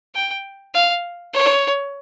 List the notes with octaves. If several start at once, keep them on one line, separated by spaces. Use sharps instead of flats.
G5
F5
C#5